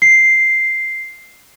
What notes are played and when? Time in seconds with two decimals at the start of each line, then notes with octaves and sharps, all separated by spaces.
0.02 C7